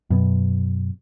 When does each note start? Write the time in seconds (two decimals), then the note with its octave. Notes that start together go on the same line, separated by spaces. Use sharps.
0.10 F#2 B2